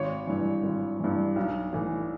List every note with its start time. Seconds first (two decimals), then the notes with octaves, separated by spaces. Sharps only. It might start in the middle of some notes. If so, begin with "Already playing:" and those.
Already playing: G#1 C#5
0.27 G2 E3
0.63 G#1
1.00 G2 E3
1.36 B1
1.73 A2 E3